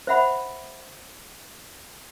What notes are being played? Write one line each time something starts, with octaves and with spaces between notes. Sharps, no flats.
C5 D#5 E5 F#5 B5